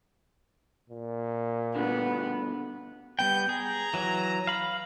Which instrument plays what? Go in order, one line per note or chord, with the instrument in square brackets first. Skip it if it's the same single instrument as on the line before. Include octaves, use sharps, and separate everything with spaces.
[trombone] A#2
[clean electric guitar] G2 B2 D3 [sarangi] B3
[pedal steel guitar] G3 B3 G5 [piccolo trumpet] G6
[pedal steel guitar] G#4 [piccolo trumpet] A#5
[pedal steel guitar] E3 F#3
F5 B5